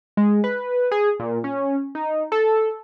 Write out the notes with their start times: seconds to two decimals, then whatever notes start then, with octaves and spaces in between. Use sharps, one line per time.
0.17 G#3
0.44 B4
0.91 G#4
1.19 A#2
1.44 C#4
1.95 D#4
2.32 A4